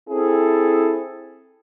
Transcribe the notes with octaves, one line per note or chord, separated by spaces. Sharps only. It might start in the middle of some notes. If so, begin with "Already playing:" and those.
C4 E4 G#4 A4